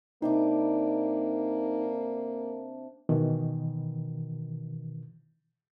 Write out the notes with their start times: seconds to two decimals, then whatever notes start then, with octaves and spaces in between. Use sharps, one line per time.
0.22 C3 A#3 D4 D#4 D6
3.09 B2 D#3 E3